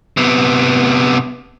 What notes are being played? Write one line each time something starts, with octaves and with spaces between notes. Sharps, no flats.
C3 B3